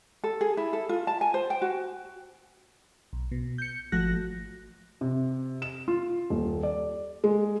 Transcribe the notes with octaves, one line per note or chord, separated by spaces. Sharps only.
A4
G#4
E4
A4
F4
A5
G#5
C5
G5
F#4
B1
B2
G6 C#7
G#1 F3 A3 F#4 F#6 A#6
C3
E7
F4
D#1
D5
G#3